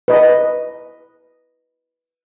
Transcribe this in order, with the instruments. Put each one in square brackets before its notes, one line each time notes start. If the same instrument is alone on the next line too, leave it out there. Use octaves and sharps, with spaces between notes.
[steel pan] B4 D#5